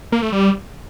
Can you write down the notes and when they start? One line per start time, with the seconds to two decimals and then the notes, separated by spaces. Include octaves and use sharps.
0.12 A#3
0.22 A3
0.32 G3